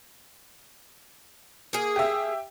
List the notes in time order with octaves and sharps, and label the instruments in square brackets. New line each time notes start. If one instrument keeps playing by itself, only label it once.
[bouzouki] A#3 G#4
[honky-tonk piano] G4 E5